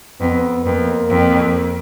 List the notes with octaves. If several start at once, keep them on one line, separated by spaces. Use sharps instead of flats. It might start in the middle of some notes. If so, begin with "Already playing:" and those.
F2 B3
F2 A#3
F2